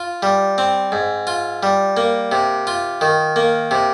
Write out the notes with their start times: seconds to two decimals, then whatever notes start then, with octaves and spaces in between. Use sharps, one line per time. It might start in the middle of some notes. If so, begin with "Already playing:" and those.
Already playing: F4
0.23 G3
0.58 C4
0.92 G#2
1.27 F4
1.63 G3
1.97 A#3
2.32 C3
2.67 F4
3.01 D#3
3.36 A#3
3.71 C3